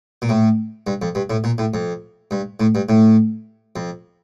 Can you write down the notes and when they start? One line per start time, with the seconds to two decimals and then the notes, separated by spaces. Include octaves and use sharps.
0.22 A#2
0.29 A2
0.87 G2
1.02 F2
1.15 G2
1.30 A2
1.44 A#2
1.58 A2
1.74 F2
2.31 G2
2.60 A2
2.75 G2
2.89 A2
3.76 F2